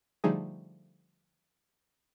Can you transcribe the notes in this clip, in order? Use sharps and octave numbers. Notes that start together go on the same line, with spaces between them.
D3 F3 G3 A3 D#4 G#4